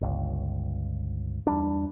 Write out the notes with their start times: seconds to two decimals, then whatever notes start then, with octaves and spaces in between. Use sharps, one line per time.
0.01 G1 C#2
1.47 E2 G3 D4